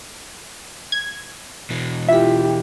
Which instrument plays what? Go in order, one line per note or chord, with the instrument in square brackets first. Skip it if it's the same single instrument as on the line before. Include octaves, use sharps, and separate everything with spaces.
[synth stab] G#6
[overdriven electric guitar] B2 E3
[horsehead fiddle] E4 G4 [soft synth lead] F4 [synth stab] E5 B6